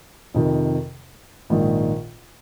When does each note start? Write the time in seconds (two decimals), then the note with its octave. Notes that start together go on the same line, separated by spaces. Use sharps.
0.34 F2 C3 D#3
1.50 A#1 G#2 D#3